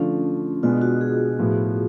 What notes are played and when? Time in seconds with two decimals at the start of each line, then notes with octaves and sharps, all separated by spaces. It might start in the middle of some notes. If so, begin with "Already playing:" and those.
Already playing: D3 F3 A3 C#4 D4 F4
0.63 B2 G#3 B3 D4 F4
0.82 F#4
1.01 G#4
1.39 A2 F3 B3